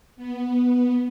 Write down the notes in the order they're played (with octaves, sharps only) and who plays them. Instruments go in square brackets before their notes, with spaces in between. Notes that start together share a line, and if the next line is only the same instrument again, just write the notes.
[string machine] B3